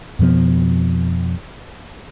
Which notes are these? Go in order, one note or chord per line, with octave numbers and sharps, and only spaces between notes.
F2 B2 F3 B3